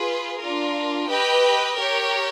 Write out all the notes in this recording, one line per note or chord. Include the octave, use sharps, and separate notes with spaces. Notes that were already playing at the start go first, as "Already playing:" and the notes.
Already playing: F4 G#4 B4
D4 F4 A#4
G4 B4 D#5 G5
G4 A#4 C#5